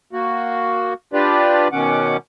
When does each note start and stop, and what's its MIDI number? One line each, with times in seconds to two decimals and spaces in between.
0.13 0.94 58
0.13 0.94 66
1.13 1.68 62
1.13 1.68 65
1.13 1.68 67
1.13 1.68 71
1.13 1.68 74
1.72 2.17 47
1.72 2.17 51
1.72 2.17 61
1.72 2.17 78
1.72 2.17 86